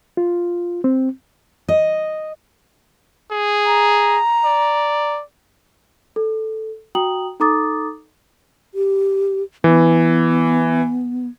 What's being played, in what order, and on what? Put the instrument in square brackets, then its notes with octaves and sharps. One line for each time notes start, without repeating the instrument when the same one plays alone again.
[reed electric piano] F4
C4
[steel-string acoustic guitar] D#5
[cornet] G#4
[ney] A#5
[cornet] D5
[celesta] A4
F#4 G5 A#5 D#6 F#7
D#4 A4 A#5 D6 D#6 A6
[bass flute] G4
[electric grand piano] E3 [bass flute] B3